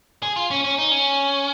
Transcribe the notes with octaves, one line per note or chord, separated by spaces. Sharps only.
G#4
F4
C#4
C#4
D#4
C#4